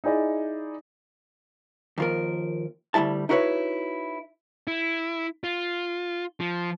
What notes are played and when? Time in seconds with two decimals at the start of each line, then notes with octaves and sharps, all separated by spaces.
0.04 D#4 E4 G#4 D5 D#5
1.98 D#2 F3 A#4
2.94 D2 G#2 G3 E4 A5
3.29 D#4 E4 F#4 A#4 B4 C#5
4.67 E4
5.44 F4
6.40 F3